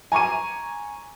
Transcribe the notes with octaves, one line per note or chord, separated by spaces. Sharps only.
G#5 A#5 C#6 D6 D#7